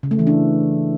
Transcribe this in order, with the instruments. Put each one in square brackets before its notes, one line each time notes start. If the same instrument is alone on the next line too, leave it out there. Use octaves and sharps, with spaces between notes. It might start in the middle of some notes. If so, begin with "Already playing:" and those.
[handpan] C#3
A3
E3
D4